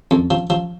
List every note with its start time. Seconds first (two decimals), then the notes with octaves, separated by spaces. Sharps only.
0.11 F2
0.31 F3
0.50 F3